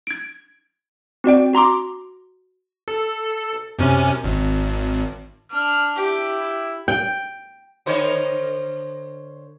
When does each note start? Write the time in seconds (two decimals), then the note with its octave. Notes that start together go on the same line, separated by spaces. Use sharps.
0.07 G#6 D7
1.24 C4 F#4 D5 G5
1.53 F#4 A#5 C6 D6
2.88 A4
3.79 F#2 C3 C#4
4.24 G#1
5.52 D4 F6
5.96 E4 G4
6.88 G5
7.86 D3 C5 C#5